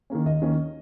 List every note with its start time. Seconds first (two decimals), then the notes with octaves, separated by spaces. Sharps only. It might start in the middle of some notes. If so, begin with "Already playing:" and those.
0.10 D#3 A#3 C#4
0.25 D#2 D#5
0.42 D#3 A#3 C#4